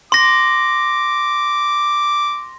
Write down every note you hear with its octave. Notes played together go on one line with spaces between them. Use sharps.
C6 D6 A#6